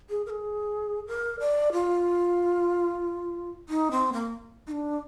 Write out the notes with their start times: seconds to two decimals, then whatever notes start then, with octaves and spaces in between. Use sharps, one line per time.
0.10 G#4
0.26 A#4
0.30 G#4
1.07 A#4
1.40 D5
1.73 F4
3.69 D#4
3.91 C4
4.13 A#3
4.67 D#4
4.72 D4